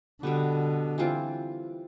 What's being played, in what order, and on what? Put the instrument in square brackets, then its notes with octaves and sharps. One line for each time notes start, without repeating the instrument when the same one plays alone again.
[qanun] B2 G3 B3 [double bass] D3
[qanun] E3 G3 C4 F4